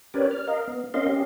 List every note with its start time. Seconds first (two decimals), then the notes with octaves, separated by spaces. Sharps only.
0.14 C#4 G4 A#4 B4 C#5 D5
0.31 F6
0.48 A#4 D#5 F5
0.68 B3
0.94 C4 C#4 A#4 D#5 F5 C6
1.09 C#4 G4